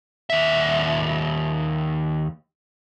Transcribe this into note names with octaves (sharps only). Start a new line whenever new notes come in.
D#2 E5